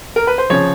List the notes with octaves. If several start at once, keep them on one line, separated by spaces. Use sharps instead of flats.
A#4
B4
C5
C#3 F3 C#5